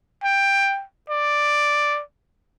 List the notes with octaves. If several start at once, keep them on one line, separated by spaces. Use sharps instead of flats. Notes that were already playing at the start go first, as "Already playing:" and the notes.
G5
D5